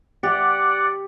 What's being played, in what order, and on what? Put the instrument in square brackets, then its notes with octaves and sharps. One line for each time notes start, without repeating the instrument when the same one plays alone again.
[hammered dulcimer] G4 [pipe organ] D5 F#5